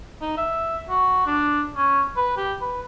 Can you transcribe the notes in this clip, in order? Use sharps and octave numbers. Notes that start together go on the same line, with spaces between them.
D#4
E5
F#4
D4
C#4
B4
G4
B4